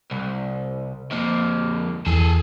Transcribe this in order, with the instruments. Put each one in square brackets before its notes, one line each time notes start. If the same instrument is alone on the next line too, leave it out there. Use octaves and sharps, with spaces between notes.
[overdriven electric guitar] C2
F2 A#3
[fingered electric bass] E2 [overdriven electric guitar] G#4 A4